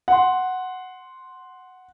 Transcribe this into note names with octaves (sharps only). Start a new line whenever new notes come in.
F#5 C6